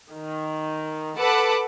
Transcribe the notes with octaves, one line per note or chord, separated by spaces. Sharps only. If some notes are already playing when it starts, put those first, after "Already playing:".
D#3
A4 B4 F#5 A5 D6